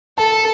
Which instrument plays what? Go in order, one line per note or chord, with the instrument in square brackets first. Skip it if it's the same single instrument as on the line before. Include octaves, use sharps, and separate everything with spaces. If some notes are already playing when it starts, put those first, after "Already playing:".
[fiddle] A4 [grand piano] A5